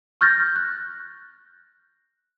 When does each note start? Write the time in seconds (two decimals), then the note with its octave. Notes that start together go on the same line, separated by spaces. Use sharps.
0.21 C#6 F6 G6 A6 A#6
0.56 F#6